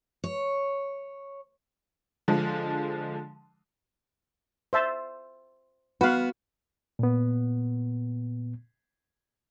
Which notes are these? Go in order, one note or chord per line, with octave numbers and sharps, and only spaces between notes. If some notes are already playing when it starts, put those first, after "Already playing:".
C#5
D3 F3 G#3
C5 E5 A5
B3 F#4 B4 F5
A#2 B3